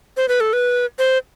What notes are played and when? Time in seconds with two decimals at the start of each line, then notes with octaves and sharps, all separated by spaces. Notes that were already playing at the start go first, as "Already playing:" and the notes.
0.17 C5
0.28 B4
0.40 A4
0.53 B4
0.99 C5